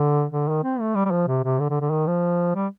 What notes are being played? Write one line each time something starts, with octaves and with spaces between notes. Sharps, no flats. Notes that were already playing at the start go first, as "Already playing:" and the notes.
Already playing: D3
D3
D#3
C4
A3
G3
G3
F3
C3
C3
D3
D3
D3
D#3
F3
G3